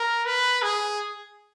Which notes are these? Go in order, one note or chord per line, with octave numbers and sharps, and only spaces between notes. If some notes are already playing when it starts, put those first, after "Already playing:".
Already playing: A#4
B4
G#4